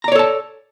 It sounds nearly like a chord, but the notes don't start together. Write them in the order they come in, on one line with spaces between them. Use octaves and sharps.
A#5 D5 C#5 A4 A5